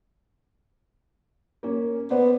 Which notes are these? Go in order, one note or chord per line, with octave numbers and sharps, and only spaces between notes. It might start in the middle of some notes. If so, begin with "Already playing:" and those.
A#3 C#4
B3 C5 D5